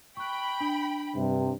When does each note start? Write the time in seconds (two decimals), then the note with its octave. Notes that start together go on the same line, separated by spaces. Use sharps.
0.17 G5 B5 C#6 F#6
0.61 D4
1.15 G2 C3